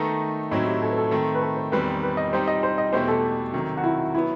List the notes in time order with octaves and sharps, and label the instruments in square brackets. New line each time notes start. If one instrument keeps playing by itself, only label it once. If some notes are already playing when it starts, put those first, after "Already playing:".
Already playing: [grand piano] D#3 A3 D#4 A4 [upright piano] B3
[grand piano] A2 F#3 C4 E4 [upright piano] D#4
[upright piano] G4
A4
B4
A4
[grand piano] D#3 A3 C4
[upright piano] B4
A4
C5
[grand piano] E2 D#3 G3 C4 [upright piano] B4
[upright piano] B4
D#5
[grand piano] G3 C4 D#4 G4 [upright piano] C5
[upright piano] D#5
C5
D#5
[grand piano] E2 B2 A3 E4 G4 [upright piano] C5
[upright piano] A4
[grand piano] C3 D#3 F#3
[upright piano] F#4
E4
[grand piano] F#3 B3 [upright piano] E4